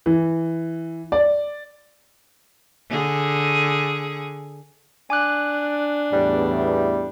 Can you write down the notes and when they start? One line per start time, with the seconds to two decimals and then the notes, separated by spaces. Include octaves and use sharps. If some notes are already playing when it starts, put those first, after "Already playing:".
0.06 E3
1.12 D5
2.90 D3 G#4
5.10 D4 G#5 D6 F#6
6.13 E2 A2 G3